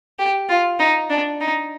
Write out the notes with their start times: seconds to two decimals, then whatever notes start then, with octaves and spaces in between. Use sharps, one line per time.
0.19 G4
0.49 F4
0.80 D#4
1.10 D4
1.41 D#4